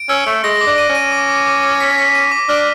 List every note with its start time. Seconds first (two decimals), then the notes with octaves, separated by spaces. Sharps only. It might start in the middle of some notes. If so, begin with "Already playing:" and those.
Already playing: D7
0.09 C#4 E6
0.26 A3 E6
0.44 G#3 A#6
0.61 D6
0.67 D4
0.78 D#7
0.89 C#4
0.95 D#7
1.12 D6
1.29 D6
1.47 D6
1.63 D6
1.80 B6
1.98 B6
2.15 D#7
2.32 D6
2.49 D4 F6